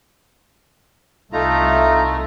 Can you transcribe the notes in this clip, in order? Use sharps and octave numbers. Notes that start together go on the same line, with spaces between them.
C2 A3 D#4 F4 A#5